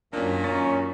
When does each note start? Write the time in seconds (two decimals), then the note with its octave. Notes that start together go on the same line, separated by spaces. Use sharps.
0.13 F#2 A#2 D#3 C#4 D4
0.44 C#4 A6